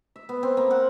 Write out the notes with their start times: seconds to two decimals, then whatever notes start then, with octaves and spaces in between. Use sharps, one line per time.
0.16 E5
0.29 B3
0.43 C4
0.57 A#3
0.71 F#5